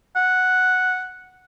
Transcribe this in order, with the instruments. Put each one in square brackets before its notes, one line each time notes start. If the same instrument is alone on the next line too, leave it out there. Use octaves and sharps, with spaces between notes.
[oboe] F#5